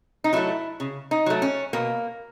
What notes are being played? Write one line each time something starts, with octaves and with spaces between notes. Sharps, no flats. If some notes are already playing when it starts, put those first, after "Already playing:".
D#4
F#3 A3 E4
C#3
D#4
F#3 A3
C#4
B2 A#3